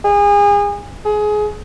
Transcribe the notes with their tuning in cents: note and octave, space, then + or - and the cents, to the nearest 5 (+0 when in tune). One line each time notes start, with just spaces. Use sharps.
G#4 -30
G#4 +20